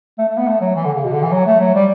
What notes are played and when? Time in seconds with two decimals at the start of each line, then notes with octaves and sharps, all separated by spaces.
0.18 A3
0.28 A3
0.38 B3
0.47 A3
0.61 F#3
0.76 E3
0.85 D3
0.94 C#3
1.04 B2
1.13 D3
1.22 E3
1.32 F#3
1.46 A3
1.60 F#3
1.75 G3